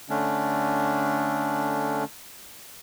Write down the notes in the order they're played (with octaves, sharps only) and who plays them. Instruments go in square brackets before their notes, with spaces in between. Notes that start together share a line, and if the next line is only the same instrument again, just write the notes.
[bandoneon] D3 A3 C#4 D4